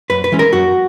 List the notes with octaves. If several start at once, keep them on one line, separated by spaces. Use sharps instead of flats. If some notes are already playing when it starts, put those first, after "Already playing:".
F#2 B4
B4
E3 G#3 C#4
A#4
F#2 F#4